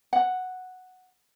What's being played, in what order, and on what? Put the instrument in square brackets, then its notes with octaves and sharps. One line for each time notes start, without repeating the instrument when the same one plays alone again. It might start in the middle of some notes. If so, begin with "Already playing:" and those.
[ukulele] F#5